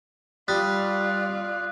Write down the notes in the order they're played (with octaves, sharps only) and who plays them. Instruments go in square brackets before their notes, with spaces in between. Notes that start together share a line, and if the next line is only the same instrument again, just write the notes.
[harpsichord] G3 [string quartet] F4 D5 [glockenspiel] D#6 A6 B6 [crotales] F#6